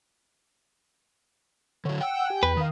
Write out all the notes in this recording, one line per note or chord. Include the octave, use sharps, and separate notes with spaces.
D3 F#3 C#5
F#5 G5 E6
G4 G#5
E2 B4
D#3 F5 D#6